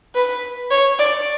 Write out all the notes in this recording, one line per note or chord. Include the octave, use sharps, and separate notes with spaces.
B4
C#5
D5